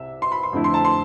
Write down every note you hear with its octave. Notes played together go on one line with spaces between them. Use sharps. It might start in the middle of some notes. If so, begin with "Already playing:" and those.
Already playing: C2 C3 E5
C6
B5
C6
F2 D3 A3 C4 E4
C6
A5
C6